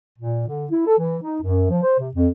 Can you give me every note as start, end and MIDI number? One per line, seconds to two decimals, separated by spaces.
0.19 0.43 46
0.47 0.66 50
0.71 0.83 64
0.86 0.95 69
0.99 1.17 52
1.23 1.37 63
1.42 1.66 42
1.70 1.79 53
1.83 1.98 72
1.99 2.09 48
2.15 2.28 41